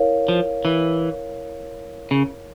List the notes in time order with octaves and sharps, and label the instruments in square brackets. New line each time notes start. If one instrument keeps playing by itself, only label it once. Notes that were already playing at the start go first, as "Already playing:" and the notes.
Already playing: [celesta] E4 A#4 C#5 F5
[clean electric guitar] F3
E3
C#3